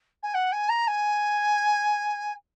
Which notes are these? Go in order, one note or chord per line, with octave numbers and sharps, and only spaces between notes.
G#5
F#5
G#5
A#5
G#5